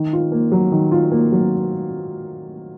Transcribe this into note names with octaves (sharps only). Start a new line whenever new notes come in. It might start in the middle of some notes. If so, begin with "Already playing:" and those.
Already playing: D#3
F4
A#3
F#3
D#3
F4
A#3
F#3